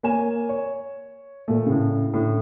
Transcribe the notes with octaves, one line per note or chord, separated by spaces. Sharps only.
A#3 C#5 G#5 E7
C#5
A#2 A3
A2 C#3
A2 D3